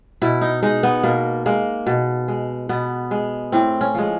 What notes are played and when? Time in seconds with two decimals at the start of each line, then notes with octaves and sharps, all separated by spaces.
0.22 B2 E4
0.41 D#4
0.62 G#3 D#4
0.83 B3
1.03 B2 A#3
1.46 G#3 A#3
1.86 B2
2.28 G#3
2.69 B2 B3
3.11 G#3
3.52 A2 C4
3.81 C#4
3.94 F3 G#3